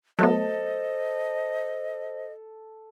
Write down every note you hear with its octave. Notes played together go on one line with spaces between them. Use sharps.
F#3 A3 B3 A4 C5 D#5